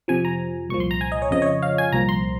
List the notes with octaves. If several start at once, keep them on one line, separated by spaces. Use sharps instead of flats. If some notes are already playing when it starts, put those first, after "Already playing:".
F2 C3 F3 G#5
A#5
C2 A#2 F3 C#6
C6
A#5
G#5
D#5
C#5
F2 C#3 F3 D#5
C#5
D#5
F5
G#5
C2 A#2 F3 A#5
C6